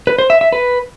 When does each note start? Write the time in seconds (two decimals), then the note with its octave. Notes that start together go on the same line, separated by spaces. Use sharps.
0.07 B4
0.18 C5
0.30 E5
0.41 E5
0.53 B4